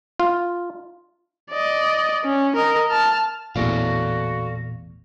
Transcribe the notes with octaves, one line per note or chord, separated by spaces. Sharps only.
F4
D5 D#5
C#4
A#4 D#5
A5 F6
A1 E2 A#2 F#4 A4 D5 F5